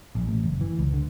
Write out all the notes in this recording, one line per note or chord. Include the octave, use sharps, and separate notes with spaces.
A#1
A1
F#1
E3
C#2
D3